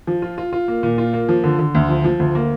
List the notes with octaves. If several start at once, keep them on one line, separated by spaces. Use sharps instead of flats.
F3
F4
F4
F4
A#3
A#2
F4
A#3
F3
D3
D3
D2
F3
F3
D2
A#3